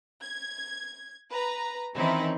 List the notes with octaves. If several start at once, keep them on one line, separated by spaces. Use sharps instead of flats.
G#6
B4 A#5
D#3 E3 C4 C#4 D#4 E4